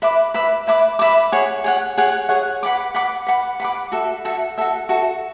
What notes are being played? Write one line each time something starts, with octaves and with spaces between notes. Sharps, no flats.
B4 E5 B5 D6
B4 E5 B5 D6
B4 E5 B5 D6
B4 E5 B5 D6
G#4 C#5 F#5
G#4 C#5 F#5
G#4 C#5 F#5
G#4 C#5 F#5
B4 F#5 B5 D6
B4 F#5 B5 D6
B4 F#5 B5 D6
B4 F#5 B5 D6
F#4 A4 E5
F#4 A4 E5
F#4 A4 E5
F#4 A4 E5